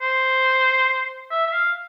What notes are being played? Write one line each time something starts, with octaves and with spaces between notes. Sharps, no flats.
C5
E5
E5
F5